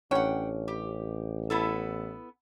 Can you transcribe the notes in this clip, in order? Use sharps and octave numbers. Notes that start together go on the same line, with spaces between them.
A1 C#4 D4 C#5 F#5 G5
G4
B3 E4 A4